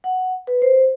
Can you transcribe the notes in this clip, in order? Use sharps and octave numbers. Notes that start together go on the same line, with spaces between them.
F#5
B4
C5